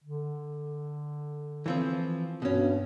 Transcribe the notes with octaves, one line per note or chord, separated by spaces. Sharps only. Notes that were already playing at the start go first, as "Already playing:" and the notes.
D3
E3 F3 C4
G2 B2 C#4